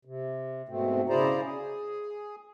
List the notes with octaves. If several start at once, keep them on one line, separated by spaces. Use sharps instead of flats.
C3
G#2 B2 A3 C4
C#3 E4 G#4 C5 D5 A#5
G#4